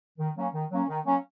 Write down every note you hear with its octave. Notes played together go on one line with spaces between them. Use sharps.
D#3
F#3 A#3 C#4
D#3
F#3 A#3 C#4
D#3
F#3 A#3 C#4